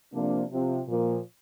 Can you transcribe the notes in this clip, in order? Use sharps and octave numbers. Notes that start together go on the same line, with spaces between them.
C3 F3 A#3 D4
C3 F3 C4
A#2 F3 A#3